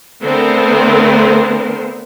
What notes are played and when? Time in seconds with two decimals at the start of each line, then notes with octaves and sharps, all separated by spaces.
0.23 D3 A3 B3 C4 A#4 C5